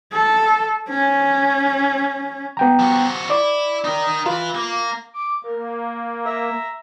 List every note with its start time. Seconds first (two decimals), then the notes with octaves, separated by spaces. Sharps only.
0.13 A4
0.90 C#4
2.57 B3 G5 A#5
2.79 F3 F#4
3.30 E4 D5
3.84 D#4 A#4
4.26 E4 F4 B4
4.55 A#3
5.13 D6
5.44 A#3 A#4
6.26 E5 A#5